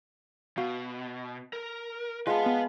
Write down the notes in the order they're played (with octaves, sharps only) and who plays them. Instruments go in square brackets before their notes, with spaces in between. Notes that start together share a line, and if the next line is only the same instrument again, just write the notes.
[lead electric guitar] B2 [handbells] F#4 F5
[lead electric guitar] A#4
[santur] G#3 A5 [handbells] F4 [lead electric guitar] B4 F#5 [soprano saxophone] F5
[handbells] B3